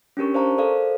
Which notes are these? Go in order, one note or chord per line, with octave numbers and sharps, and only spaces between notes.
C#4 D4 G4 A#4 C#6
C5 D5 F5 A5 A#5 C#6
A4 A#4 C5 D5 F5